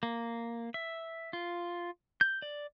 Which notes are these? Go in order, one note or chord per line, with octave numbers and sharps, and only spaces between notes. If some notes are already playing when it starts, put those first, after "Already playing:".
A#3
E5
F4
G6
D5